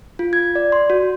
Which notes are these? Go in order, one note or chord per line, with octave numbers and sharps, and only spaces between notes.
F4
G#6
D5
C6
F#4